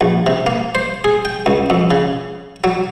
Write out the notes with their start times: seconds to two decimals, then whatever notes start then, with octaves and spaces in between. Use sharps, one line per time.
0.01 A#1
0.26 C3
0.47 A#3
0.75 C5
1.04 G#4
1.25 G5
1.46 C#2
1.70 F2
1.91 C#3
2.64 F#3